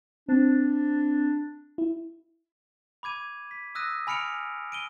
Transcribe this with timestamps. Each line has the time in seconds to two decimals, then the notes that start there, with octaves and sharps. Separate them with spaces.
0.29 C4 D4
1.78 E4
3.03 B5 D6 G#6 D#7
3.51 B6
3.75 D#6 E6 F#6 A#6 D#7
4.07 G#5 B5 F6 C#7 D7 F7
4.72 D7 D#7 G7